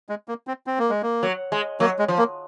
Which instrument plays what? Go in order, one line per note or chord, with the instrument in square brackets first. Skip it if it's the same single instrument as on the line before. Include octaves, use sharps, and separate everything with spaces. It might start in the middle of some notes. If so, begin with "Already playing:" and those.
[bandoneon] G#3
A#3
C4
C4
A#3
G#3
A#3
[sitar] F#3
G#3
[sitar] F#3 [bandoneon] A#3
[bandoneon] G#3
[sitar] F3
[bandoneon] A#3